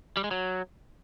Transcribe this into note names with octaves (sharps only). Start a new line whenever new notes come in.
G3
G#3
F#3